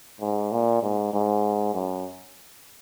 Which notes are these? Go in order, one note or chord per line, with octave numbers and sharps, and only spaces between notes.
G#2
A#2
G#2
G#2
F#2